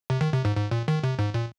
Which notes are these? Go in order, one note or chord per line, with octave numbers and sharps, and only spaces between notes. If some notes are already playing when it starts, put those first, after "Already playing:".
C3
D#3
C3
G#2
G#2
A#2
D#3
C3
G#2
A#2